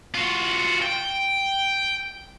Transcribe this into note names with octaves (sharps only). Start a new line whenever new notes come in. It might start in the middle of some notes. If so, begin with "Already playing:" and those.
F4 F#4
G5